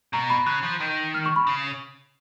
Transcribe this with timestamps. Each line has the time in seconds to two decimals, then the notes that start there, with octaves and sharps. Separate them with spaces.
0.13 B2 A#5
0.30 B5
0.46 C#3 F#6
0.63 F3
0.80 D#3
1.14 F6
1.26 C#6
1.36 B5
1.47 C#3